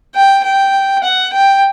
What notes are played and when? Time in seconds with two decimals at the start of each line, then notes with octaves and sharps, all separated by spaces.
0.15 G5
0.44 G5
1.04 F#5
1.33 G5